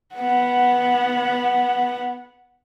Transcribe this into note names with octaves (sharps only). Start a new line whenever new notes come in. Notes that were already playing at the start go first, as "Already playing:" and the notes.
B3 F#5